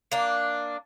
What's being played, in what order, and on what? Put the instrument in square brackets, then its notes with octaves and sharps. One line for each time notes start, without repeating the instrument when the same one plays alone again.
[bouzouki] A#3 D4